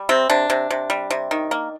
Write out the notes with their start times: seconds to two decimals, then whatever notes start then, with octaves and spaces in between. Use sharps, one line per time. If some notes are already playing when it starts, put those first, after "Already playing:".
Already playing: G3
0.09 C3 C4
0.30 C3 D4
0.50 C3
0.70 C3
0.90 G3
1.11 C3
1.31 D#3
1.51 A#3